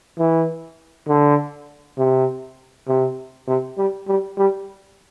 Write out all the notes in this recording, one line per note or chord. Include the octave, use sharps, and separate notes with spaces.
E3
D3
C3
C3
C3
G3
G3
G3